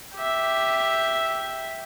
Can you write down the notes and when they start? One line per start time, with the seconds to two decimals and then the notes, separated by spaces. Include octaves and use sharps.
0.15 G4 E5